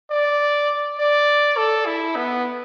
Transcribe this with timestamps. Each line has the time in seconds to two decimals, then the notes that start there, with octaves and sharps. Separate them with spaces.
0.10 D5
0.99 D5
1.57 A4
1.86 E4
2.16 B3